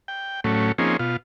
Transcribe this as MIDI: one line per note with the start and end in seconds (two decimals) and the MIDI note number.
0.08 0.40 79
0.44 0.72 45
0.44 0.72 54
0.44 0.72 57
0.44 0.72 61
0.78 0.97 53
0.78 0.97 58
0.78 0.97 60
0.78 0.97 61
0.78 0.97 63
0.78 0.97 68
0.99 1.17 47
0.99 1.17 65